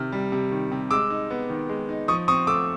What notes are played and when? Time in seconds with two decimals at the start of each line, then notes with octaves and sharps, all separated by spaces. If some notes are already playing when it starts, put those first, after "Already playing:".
Already playing: C3 D#3 F6
0.12 G3
0.32 C3
0.52 D#3
0.72 C3
0.91 G#3 D6 E6
1.10 D#4
1.30 B3
1.50 D#3
1.69 G#3
1.89 D#4
2.08 F3 C#6 D#6
2.28 C4 C#6 D#6
2.47 A3 D6 E6